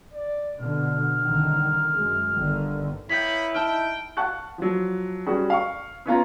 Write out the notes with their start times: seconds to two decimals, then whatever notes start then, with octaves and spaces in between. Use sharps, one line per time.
0.14 D5
0.59 B2 D3 F6
1.24 C2 D3 D#3
1.94 F#2 G#3
2.37 G1 D3 D#3
3.09 A#3 B3 E4 C#5 G5 B5 G6 B6
3.55 D#4 D#5 G5 A5 F6
4.17 F5 F#5 A5 C#6 F#6
4.58 F3 F#3
5.26 G3 C#4 F#4 G#4
5.50 F5 C#6
6.06 B3 C#4 F4 A#5